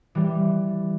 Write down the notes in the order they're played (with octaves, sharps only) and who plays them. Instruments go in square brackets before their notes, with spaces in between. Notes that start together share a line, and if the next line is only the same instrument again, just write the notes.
[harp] E3 G3